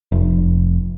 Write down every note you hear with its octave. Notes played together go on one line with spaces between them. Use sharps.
F1